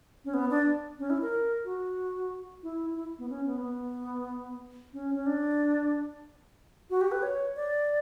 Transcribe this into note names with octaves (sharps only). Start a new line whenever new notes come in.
C#4
B3
D4
C#4
E4
A#4
F#4
E4
E4
B3
C#4
B3
B3
C#4
C#4
D4
F#4
G4
B4
C#5
D5